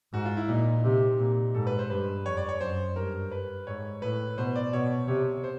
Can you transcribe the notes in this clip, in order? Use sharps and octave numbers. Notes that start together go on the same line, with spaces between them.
G#2 F#4
F4
E4
A#2 D#4
C3
A#2
G#2 A4
B4
C5
G2 B4
F2 C#5
D5
C#5
F#2 C5
G2 A#4
B4
G#2 C#5
A2 B4
B2 C5
D5
B2 C#5
C3 C#5
C5